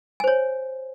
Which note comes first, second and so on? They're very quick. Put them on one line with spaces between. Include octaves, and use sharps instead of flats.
G#5 C5 C#5